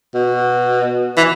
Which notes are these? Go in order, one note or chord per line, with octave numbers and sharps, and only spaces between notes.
B2
E3